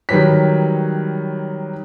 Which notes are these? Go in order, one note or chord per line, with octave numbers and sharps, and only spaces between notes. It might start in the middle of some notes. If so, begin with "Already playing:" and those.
D#3 F#3 G3 B4 C#5 B6